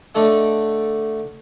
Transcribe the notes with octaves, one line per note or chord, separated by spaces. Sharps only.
D3 A3 D4 A4 D#5